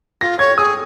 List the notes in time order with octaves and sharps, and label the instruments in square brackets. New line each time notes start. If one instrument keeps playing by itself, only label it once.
[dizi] F4 [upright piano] A#6
[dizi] C#5 [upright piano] G#6
[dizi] G#4 [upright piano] D#6